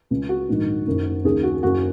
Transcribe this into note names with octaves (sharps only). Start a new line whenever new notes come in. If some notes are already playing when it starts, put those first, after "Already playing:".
C#2 C#3
F#4
A#1 G#2 D#3
F#1 F#2 D#3
D#2 C#3 G#4
F#4
F#1 F#2 C#3 F#4